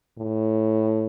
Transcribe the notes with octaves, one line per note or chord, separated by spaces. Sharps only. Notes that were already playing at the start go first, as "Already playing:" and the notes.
A2